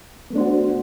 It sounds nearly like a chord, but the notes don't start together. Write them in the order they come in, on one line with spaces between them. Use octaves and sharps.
B3 A3 D4 C5 F#4